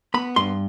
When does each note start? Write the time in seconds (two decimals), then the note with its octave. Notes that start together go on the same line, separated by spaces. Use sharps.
0.14 B3 B5
0.36 G2 C6